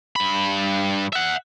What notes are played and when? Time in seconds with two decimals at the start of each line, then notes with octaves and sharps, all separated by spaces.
0.16 G2 B5
1.13 E5 F#5